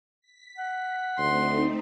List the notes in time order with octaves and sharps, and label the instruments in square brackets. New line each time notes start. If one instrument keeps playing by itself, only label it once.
[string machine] B6
[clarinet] F#5
[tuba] D2 [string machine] A3 C4 D#4 [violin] C6